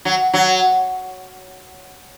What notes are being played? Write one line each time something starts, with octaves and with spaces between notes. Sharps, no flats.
F#3
F#3